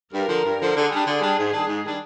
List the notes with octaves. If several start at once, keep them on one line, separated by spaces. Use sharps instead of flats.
G2 A#4
D3 F3
G2
D3 F3
D3 G#4
G3 D4
D3 G#4
G3 D4
G#2
D#3 G3 D4
G#2
D#3 G3 D4